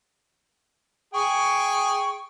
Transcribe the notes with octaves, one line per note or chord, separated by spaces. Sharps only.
G#4 G5 C#6